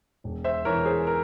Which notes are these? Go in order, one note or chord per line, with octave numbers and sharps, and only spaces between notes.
E1
C5 E5
E3 A#4 C#5
G#4 C5
A#4